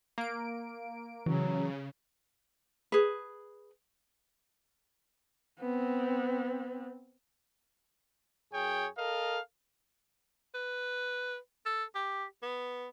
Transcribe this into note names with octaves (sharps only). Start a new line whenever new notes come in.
A#3 D7
C#3 E3 F#3
G#4 B4
B3 C4
F#2 G#4 C#5 G5
A4 A#4 D#5 F5
B4
A4
G4
B3